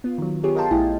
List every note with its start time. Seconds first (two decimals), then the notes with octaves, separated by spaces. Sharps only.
0.04 B3 F4
0.18 D#3 F#3
0.44 B3 F4 G4 G#4 C#5
0.55 A#4 D#5 F5 G5 A5 C6
0.71 A#1 A3 E4 G4 D#5 G#5